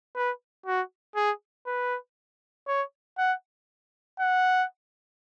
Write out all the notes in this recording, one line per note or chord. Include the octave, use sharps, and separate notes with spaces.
B4
F#4
G#4
B4
C#5
F#5
F#5